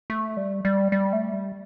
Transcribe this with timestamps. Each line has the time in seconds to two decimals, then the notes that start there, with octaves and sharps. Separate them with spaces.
0.10 A3
0.37 G3
0.65 G3
0.92 G3
1.13 A3
1.33 G3